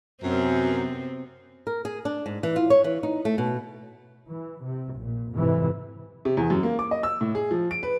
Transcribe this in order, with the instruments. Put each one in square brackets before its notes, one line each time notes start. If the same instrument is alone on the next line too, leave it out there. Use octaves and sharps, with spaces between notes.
[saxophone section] F#2 [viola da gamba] C3 B3 C4
[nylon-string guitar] A#4
G#4
D4
G#2
E3
F4
C#5
E3
D#4
A3
B2
[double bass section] E3
C3
A#1 A#2
F2 G#2 C3 E3
[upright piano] C3
E2
F#2
A#3
D6
D#5
E6
A2
G#4
F3
D7
B4